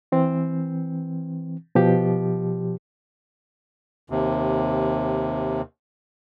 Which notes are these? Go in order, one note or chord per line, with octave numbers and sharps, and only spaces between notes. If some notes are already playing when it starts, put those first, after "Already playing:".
E3 C4
B2 F3 G4
D#2 C3